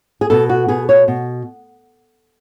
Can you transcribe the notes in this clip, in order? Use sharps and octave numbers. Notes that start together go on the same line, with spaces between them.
G#4
B2 A4
F#4
B2 G#4
C#5
B2